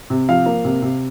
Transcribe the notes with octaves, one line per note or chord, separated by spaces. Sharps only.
C3
F3 F5
A#3
C3
C3